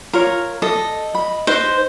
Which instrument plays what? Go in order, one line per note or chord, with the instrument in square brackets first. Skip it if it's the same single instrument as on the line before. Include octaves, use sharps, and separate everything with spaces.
[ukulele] F4 C#5 [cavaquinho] A#4
[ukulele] A4 [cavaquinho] D#5
[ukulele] B5
[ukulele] D#4 B4 D#5 [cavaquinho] C5